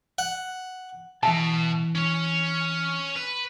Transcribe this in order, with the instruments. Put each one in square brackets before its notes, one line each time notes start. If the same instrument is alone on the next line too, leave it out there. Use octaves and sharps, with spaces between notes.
[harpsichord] F#5
[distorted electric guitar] B2 [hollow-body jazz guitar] E3 E5 A5
[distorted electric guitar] C#4 C#5
B4